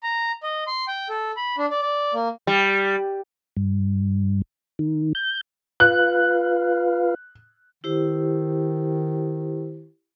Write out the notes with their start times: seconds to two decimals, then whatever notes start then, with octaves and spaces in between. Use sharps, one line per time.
0.03 A#5
0.43 D#5
0.67 C6
0.88 G5
1.09 A4
1.37 B5
1.58 D4
1.71 D5
1.82 D5
2.14 A#3
2.47 G3
3.57 G2
4.79 D#3
5.15 G6
5.80 F4 B4 F5 F#6
7.84 D#3 E4 G4 C5